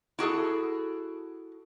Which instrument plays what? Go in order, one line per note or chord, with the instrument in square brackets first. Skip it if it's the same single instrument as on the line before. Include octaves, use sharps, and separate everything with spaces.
[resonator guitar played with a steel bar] E4 F#4 G#4 A4